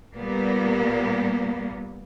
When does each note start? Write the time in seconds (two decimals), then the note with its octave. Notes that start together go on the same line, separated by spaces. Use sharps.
0.16 A#2 G3 A#3 B3